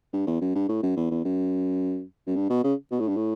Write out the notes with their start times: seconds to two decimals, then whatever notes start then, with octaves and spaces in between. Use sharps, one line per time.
0.13 G2
0.27 E2
0.41 F#2
0.55 G2
0.69 A2
0.83 F#2
0.97 E2
1.11 E2
1.25 F#2
2.27 F#2
2.36 G2
2.50 B2
2.64 C#3
2.92 B2
3.00 A2
3.08 G2
3.17 A2